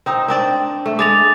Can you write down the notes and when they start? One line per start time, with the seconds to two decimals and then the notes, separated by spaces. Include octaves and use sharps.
0.06 C4 D#4
0.28 C4 D4 D5
0.86 A3
0.99 G#3 D6 A6 F7